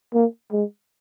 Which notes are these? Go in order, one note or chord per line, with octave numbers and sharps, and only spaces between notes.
A#3
G#3